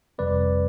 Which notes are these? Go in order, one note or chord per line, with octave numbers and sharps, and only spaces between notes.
G1 F2 C3 G3 C4 B4 D5